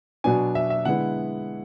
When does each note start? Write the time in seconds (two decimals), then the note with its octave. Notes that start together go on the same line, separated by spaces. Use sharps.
0.24 B2 F#3 B3 D4 G#5
0.55 E5
0.70 E5
0.85 D3 G#3 B3 E4 F#5